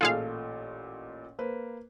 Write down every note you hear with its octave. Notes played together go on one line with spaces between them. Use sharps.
A1 A#2 F4 G#4 A4 F5
A#3 B4 C5